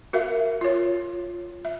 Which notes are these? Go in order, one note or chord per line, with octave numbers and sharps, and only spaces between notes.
F#4 A#4 E5 F5
F4 C#5
E5